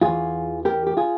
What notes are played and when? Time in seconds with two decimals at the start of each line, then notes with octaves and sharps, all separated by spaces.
0.01 E2 E3 F4 G#4
0.65 G4 A#4
0.87 G4
0.97 F4 G#4